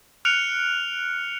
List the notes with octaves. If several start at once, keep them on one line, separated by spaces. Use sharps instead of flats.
F6 F#6 C#7 D7 F7